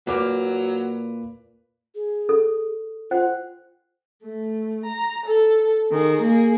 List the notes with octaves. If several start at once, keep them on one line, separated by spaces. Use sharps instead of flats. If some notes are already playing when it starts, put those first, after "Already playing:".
A#2 F#3 A#3 B4 D6
G#4
A4
F4 C5 F#5 G5
A3
A#5
A4
D#3 G#4
A#3 G#4